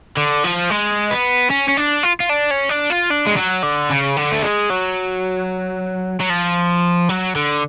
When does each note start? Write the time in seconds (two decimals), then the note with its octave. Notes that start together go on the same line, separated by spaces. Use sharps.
0.17 D3
0.44 F3
0.70 G#3
1.11 B3
1.50 C#4
1.68 C#4
1.77 D4
2.03 F4
2.20 F4
2.30 D4
2.51 C#4
2.69 D4
2.90 F4
3.11 D4
3.27 G#3
3.37 F#3
3.63 D3
3.90 C#3
4.17 D3
4.32 A3
4.42 G#3
4.70 F#3
6.20 F#3
6.30 F3
7.09 F#3
7.35 D3